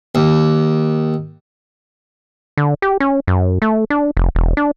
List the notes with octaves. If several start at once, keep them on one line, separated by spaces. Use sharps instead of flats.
D#2
D3
G4
C#4
F#2
A3
D4
F1
E1
D4